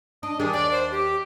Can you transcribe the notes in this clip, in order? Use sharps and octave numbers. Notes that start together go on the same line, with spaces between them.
D4 D#5
D#3 G3 D4 G#4
D#2 D5
C5
G4